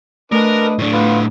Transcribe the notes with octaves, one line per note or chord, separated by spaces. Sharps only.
A3 D4 A#4 B4 D#5
A2 D4
B3 F4 B4